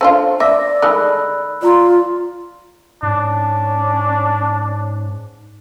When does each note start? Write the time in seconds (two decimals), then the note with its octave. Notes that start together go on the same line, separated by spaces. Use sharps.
0.01 A3 D4 F4 C5
0.40 D5 E5 D6 E6 A#6
0.82 D#3 G#3 A3 B5 E6 F#6
1.62 F4 D5 A#5 C6
3.03 G#2 C#4 D4